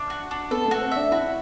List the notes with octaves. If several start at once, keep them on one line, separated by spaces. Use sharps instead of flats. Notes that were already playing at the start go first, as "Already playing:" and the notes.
Already playing: D4
F#4
D4
B3 A4
A3
F#4
C4
D4 E5
E4 F#4